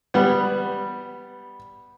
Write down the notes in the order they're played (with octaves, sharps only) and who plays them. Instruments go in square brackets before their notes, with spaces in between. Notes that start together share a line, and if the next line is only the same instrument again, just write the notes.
[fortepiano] G3 B3